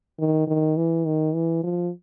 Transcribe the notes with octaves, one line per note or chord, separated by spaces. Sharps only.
D#3
D#3
E3
D#3
E3
F3